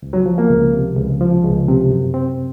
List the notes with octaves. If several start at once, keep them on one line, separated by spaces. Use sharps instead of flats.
C#2
F#3
F3
A#3
C#2
C3
C#2
F3
C#2
C3
F#2
C4